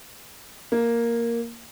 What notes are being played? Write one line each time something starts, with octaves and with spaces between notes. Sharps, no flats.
A#3